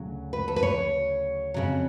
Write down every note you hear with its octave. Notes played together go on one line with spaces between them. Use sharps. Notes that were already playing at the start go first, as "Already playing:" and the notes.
Already playing: D2 C#3 F#3
B4
A4
B4
C#5
F2 C#3 F#3